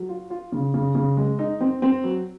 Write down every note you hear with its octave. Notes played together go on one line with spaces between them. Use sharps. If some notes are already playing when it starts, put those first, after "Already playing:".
Already playing: F#3
F4
F4
C#3
C#3
C#3
G#3
D#4
C4
C4
F#3